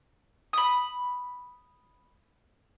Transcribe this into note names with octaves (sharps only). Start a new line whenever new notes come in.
B5 D#6